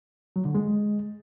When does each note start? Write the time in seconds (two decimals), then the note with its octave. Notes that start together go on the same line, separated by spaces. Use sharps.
0.36 F#3
0.45 D3
0.55 G#3